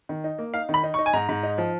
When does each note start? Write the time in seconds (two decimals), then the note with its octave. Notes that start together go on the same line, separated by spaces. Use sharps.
0.09 D#3
0.24 D#4
0.38 A#3
0.54 D#4 F5
0.69 D#3
0.74 B5
0.83 D#4
0.94 C#6
0.99 D#4
1.06 G#5
1.13 G#2 A#5
1.29 G#2
1.43 D#4
1.58 F3